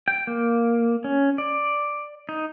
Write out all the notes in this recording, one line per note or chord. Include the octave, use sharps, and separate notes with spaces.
G5
A#3
C#4
D5
D#4